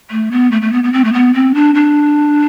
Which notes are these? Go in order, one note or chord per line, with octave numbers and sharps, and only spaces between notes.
A3
B3
A3
A3
B3
B3
C4
A3
B3
C4
D4
D4